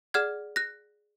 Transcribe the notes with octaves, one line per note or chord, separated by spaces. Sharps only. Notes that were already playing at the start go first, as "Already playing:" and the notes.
G#4 D5 F#5 F6 G#6
F#6 A#6